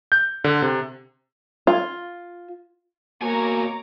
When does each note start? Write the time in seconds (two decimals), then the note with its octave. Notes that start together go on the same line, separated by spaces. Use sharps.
0.12 G6
0.44 D3
0.62 C3
1.67 F4
3.22 B2 A#3 F#4 C#5 G#5 A#5 D6